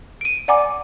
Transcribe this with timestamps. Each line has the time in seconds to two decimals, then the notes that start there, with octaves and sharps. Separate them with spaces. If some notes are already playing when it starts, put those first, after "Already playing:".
0.21 D7 D#7
0.48 D5 F#5 G#5 A#5 D6